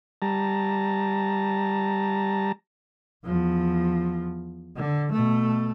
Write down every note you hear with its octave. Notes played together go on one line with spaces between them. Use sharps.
G3 A5 A#5
E2 F3
D3
B2 A3